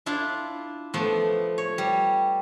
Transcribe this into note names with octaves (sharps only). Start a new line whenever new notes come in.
D4 E4 F4 F5
F3 A3 B3
C#5
G3